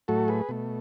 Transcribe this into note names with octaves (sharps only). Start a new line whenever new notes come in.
A2 F#3 A3 F#4 A4
G#4 B4
B2 A3